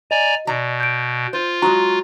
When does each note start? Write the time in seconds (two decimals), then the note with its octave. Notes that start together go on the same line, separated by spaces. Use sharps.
0.11 D5 D#5 G#5 A#5
0.47 B2 D5 A#5
0.80 G6 D7
1.33 F4 C5
1.62 F#3 G#3 F#4 A#5